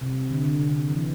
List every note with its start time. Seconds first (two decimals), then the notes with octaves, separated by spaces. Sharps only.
0.01 C3
0.30 D3
0.45 D3
0.57 C3
0.69 D3
0.89 E3